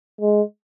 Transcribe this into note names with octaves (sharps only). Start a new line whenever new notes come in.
G#3